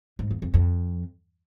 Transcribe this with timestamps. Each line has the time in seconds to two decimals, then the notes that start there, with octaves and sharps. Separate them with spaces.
0.19 G#2
0.31 E2
0.42 F2
0.54 F2